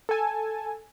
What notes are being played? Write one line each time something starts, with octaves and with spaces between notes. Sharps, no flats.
A4 G#5 A5